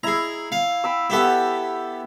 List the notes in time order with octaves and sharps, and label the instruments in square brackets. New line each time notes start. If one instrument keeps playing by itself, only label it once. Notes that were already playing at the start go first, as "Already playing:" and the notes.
[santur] E4 [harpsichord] G#4 A#5
[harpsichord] F5
[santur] G5 B5 E6
[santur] B3 E5 [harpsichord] E4 G4 A4